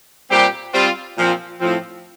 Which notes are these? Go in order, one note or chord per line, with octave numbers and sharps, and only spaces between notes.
A#2 G3 C4 G4
G3 C4 F4
A#2 F3 C4
A2 F3 C4